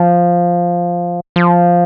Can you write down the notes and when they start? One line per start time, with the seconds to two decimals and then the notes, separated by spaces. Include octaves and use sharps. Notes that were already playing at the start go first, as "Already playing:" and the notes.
Already playing: F3
1.36 F3